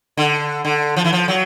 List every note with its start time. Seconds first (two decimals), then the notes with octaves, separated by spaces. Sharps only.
0.17 D3
0.65 D3
0.96 F3
1.04 E3
1.13 F3
1.28 F#3